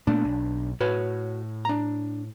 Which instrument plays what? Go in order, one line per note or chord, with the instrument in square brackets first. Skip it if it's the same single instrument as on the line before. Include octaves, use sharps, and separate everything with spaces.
[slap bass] A#2 A3 B3 [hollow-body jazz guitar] D4
[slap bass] B1
[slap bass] A2 [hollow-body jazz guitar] F#4 B4 C#5
[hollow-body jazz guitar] D4 A#5